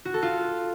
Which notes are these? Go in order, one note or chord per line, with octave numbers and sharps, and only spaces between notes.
F#4
A4
F4